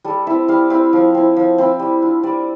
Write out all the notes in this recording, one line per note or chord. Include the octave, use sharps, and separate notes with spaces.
G3 A4
C4 E4 E5
G3 F5
C4 E4
F3
C4 E4
F3
C4 E4
G3
D4 F4
G3 D5